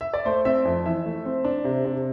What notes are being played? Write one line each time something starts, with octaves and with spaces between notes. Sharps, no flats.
E5
D5
A3 C5
C4 E5
F2
E3 E5
A3
C4
D4
C3
C3